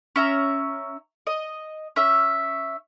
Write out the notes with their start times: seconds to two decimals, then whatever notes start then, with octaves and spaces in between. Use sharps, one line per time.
0.16 C#4 E5 A#5
1.27 D#5
1.96 C#4 E5